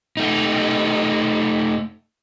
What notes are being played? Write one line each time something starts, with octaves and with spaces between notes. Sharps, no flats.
A3 D#4